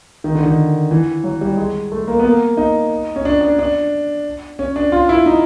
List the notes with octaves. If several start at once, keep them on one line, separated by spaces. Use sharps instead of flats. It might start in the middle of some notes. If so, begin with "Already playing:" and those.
D#3
D3
D#3
E3
F#3
G3
G#3
A3
A#3
B3
A#3
D#4
C#4
D4
D4
D4
C#4
D4
F4
E4
D#4